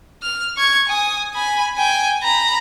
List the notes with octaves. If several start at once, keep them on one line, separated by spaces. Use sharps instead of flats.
F6
C#6 G#6
G#5 D#6
G#5 B5
G5 G#5
A#5 B5